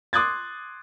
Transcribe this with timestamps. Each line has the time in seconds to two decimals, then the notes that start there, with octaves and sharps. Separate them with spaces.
0.13 C6 D6 D#6 F#6 G#6 A6